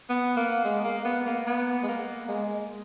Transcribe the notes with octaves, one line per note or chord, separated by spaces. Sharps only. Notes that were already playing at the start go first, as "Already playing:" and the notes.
B3
A#3
G#3
A#3
B3
A#3
B3
G#3
A#3
G#3